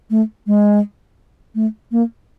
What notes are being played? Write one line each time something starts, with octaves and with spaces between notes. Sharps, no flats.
A3
G#3
A3
A#3